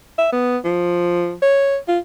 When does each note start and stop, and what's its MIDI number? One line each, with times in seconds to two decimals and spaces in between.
0.18 0.32 76
0.32 0.58 59
0.64 1.34 53
1.42 1.77 73
1.88 1.99 65